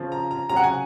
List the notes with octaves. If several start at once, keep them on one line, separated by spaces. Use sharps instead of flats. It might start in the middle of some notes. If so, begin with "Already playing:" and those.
Already playing: C#3 F3
A#5
A#5
C#3 F#3 A#5
F#5
G#5